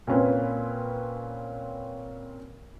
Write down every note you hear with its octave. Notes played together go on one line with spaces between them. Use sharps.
A#2 C4 C#4 B4